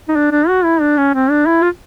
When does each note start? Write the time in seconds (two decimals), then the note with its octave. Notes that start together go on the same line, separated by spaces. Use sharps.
0.09 D#4
0.16 D4
0.32 D4
0.48 F#4
0.64 E4
0.81 D4
0.97 C#4
1.14 C4
1.30 D4
1.46 E4
1.62 F4